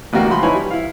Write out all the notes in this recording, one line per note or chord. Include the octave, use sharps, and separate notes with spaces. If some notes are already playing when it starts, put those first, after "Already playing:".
A1 D2 G3 A#3 F#4 G5
C#2 F3 B5 C6
D#4 E4 B4 C#5 G#5 B5
G3
E4 F5